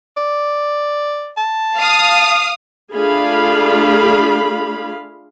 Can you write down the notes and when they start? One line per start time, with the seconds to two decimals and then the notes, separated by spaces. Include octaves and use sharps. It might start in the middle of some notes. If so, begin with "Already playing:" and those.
0.17 D5
1.37 A5
1.76 F5 D#6
2.95 A3 D4 F4 G#4 F5 B5